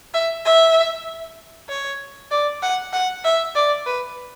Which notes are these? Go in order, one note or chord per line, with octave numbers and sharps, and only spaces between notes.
E5
E5
C#5
D5
F#5
F#5
E5
D5
B4